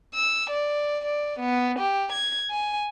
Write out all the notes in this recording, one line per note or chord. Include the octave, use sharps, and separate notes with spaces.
E6
D5
D5
B3
G4
G#6
G#5